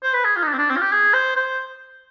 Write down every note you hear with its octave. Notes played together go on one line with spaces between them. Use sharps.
C5
B4
G#4
F4
D#4
D4
C4
D4
C4
F4
G4
G#4
C5
C5